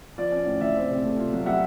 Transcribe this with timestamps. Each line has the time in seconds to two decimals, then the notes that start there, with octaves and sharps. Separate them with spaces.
0.18 F3 D5
0.32 C#4
0.46 A2
0.61 E3 D5 E5
0.76 C4
0.90 C3
1.03 A3
1.18 F4
1.33 F#3
1.46 G3 E5 F#5